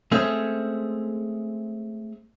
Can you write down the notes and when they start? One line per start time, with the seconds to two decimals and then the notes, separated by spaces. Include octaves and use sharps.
0.12 G#3 A3 C4 C#4 G#4